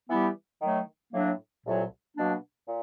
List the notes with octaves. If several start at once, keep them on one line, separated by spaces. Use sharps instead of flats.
E3 G3 B3 E4 G4
D#3 F#3 A3
A2 F#3 A#3 D4
C2 A#2 F#3 A3
B2 F#3 A#3 D4
A#2